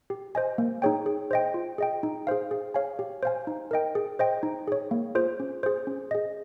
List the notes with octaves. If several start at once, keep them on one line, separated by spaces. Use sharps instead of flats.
G4
C5 D#5 G#5
A#3
D#4 G#4 C#5 G5
G#4
C5 D#5 G5
F4
G#4 D#5 G5
D#4
G#4 C5 F5
G#4
C#5 F5 G#5
G4
C5 F5 G#5
D#4
A#4 D#5 G5
G#4
C5 D#5 G5
D#4
G#4 C#5
A#3
F4 G#4 C5
C#4
G#4 C5
C#4
G#4 D#5